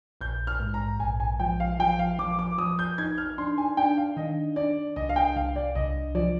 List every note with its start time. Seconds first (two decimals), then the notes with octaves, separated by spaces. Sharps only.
0.21 A#1 G6
0.47 F6
0.60 G#2
0.74 A#5
1.00 A#1 G#5
1.20 G#5
1.40 F3 G5
1.60 F5
1.79 F3 G5
1.99 F5
2.19 F3 D6
2.39 D6
2.58 F3 D#6
2.79 G6
2.98 D#4 G#6
3.18 F6
3.38 D4 C6
3.58 G#5
3.77 D4 G5
3.97 F5
4.17 D#3 D#5
4.56 D4 D5
4.96 C2 D#5
5.09 F5
5.16 G5
5.36 C2 F5
5.56 D5
5.75 C2 D#5
6.15 F3 D5